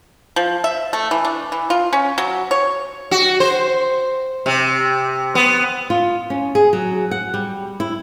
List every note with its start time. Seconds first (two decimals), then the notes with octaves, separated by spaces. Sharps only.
0.36 F3
0.64 E5
0.93 A3
1.11 E3
1.25 D4
1.52 E3
1.70 F4
1.93 C#4
2.18 F#3
2.51 C#5
3.11 F#4
3.40 C5
4.46 C3
5.35 B3
5.90 F4
6.30 C#4
6.55 G#4
6.73 F#3
7.11 F#5
7.34 G3
7.80 E4